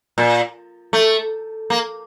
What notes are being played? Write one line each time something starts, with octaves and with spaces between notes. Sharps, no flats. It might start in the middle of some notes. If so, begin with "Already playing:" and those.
A#2
A3
A#3